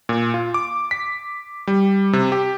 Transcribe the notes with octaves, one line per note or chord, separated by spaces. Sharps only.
A#2
F4
D6
B6
G3
C3
G4